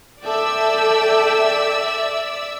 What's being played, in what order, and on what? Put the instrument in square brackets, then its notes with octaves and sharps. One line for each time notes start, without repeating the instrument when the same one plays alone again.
[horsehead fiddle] A4 G5 [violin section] D5 E5 E6